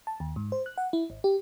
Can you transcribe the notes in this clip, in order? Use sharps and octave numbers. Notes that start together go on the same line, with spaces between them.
A5
D#2
G#2
C5
F#6
F#5
E4
G#1
G4